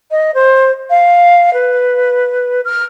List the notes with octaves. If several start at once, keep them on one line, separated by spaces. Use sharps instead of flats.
D#5
C5
F5
B4
F6